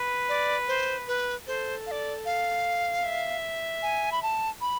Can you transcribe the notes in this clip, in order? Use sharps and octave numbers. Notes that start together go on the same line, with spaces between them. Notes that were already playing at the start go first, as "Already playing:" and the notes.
Already playing: B4
D5
C5
B4
A4 C5
F5
D5
F5
E5
G#5
B5
A5
B5